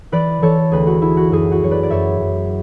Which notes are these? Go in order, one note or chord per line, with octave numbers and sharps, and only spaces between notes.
E3 B4 D5
E3 A4 C#5
D2 G#4 B4
F#4
D2 E4
F#4
F#2 E4 G#4
F#4
F#3 C#5
B4 D5
D5
F#2 C#5 E5
F#2